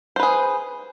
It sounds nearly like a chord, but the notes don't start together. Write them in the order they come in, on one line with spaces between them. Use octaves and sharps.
C5 B4 G#4